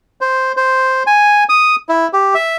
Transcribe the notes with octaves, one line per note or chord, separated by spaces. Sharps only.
C5
C5
G#5
D#6
E4
G4
E5